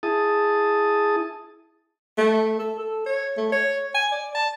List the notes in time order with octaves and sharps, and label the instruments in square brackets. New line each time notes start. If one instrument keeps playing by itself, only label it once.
[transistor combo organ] E4 G#4 A5 D#6
[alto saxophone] A3
A4
A4
C#5
A3
C#5
G#5
D5
A5